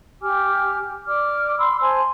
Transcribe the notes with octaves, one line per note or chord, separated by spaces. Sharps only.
G4 G#5 D6 F6
D5 D6 F6
B5 C6 E6
C5 G#5 A5 C6